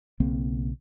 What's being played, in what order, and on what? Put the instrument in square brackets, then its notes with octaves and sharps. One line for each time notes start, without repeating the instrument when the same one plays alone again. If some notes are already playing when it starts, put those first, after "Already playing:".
[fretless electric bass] B1 C#3 A#3 C4